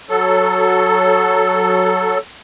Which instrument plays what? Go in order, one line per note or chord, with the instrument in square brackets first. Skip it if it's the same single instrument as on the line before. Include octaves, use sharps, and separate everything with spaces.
[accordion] F#3 A4